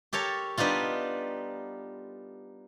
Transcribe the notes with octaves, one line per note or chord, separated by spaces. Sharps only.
G4 A4 A#4 C#5 A5
G3 B3 D4 D#4 F4